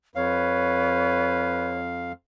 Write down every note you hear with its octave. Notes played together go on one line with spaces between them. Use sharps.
F2 B4 C#5 F5